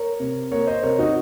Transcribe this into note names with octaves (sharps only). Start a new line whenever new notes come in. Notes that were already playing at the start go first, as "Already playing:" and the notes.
Already playing: A#4 C#5
C3
A#3 A#4 C#5
C5 D#5
C3 A#4 C#5
D#4 F#4